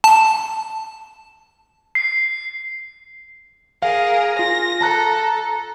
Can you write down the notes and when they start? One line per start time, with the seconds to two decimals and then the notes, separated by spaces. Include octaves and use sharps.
0.04 A5
1.95 C7
3.82 G#4 A#4 F5
4.39 F4 A#6
4.81 A4 A5 A#5 F#6